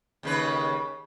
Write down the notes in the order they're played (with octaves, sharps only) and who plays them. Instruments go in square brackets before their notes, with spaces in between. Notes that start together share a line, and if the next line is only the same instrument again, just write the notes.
[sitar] D#2 C#3 B4